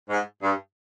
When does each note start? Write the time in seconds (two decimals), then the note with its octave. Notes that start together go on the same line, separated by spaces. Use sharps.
0.10 G#2
0.43 G2